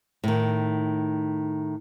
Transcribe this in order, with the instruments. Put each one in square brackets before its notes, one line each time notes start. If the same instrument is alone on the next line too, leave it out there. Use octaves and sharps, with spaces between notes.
[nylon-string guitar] A2 D#3